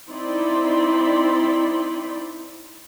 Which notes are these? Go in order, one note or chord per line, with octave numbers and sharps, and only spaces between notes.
C4 D#4 E4 D5 B5 C6